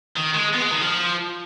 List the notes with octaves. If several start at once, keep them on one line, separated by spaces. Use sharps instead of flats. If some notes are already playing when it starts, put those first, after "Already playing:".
D#3
G#3
B3
G#3
D#3
F3